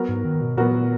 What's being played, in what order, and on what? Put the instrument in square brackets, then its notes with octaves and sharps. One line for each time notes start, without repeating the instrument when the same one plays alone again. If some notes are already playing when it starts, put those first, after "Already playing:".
Already playing: [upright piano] F#3 B3 F#4 A#4
[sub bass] G#2
D#3
B2
[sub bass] A#2 [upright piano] F#3 B3 F#4 A#4